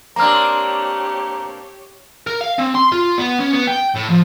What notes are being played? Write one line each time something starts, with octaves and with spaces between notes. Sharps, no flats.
A#3 C4 D4 G4 C#5 A#5 F6
A#4
F5
C4
C6
F4
B3
C#4
B3
G5
A2
F3